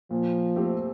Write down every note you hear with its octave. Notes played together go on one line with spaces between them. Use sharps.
A#2 F3
A3 C4 G4